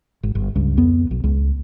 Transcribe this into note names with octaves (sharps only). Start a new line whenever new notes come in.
G#1
G1
C#2 G2
F2 B3
B1
C#2